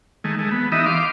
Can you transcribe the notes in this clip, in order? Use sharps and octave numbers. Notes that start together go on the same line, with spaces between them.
D#3 G#3 A3
G#3 A3
B3
E3 B3 D#4 G4 D#5 E5
F5 C6 D6